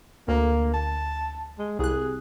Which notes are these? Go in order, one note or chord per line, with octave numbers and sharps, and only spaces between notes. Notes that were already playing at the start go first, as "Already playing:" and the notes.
D2 A#3
A5
G#3
C2 G#4 F#6